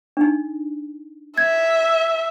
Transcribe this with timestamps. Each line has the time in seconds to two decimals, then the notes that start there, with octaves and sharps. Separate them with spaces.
0.17 D4 D#4
1.38 E5 G#6